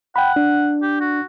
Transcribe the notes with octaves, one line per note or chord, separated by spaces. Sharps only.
F#5 G5 B5
D4
G4
F#4